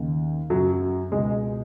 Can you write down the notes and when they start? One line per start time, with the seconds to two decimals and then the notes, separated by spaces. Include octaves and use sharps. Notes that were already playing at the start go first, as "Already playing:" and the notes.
Already playing: D#2 C#3
0.50 F#2 C#3 F#3
1.12 C#2 B2 G#3